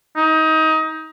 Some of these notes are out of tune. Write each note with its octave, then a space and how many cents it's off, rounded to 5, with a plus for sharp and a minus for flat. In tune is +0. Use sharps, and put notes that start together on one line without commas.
D#4 +25